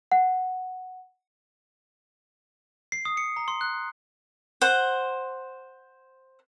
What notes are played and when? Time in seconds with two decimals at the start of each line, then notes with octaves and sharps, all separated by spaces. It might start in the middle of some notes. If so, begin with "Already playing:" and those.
0.12 F#5
2.92 C7
3.05 D#6
3.17 C#7
3.37 A#5
3.48 C6
3.61 F#6
4.62 C5 F#5